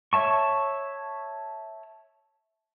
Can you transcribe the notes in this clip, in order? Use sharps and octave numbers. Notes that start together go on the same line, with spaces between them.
C#5 E5 A5 C#6